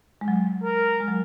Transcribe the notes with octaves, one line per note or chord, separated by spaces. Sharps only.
G#3
F#3
A#4
G#3
F#3